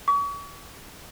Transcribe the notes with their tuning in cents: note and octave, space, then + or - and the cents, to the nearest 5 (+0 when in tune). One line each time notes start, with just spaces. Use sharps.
C#6 +40